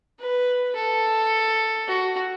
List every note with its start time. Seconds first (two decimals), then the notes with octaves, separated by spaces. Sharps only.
0.20 B4
0.75 A4
1.88 F#4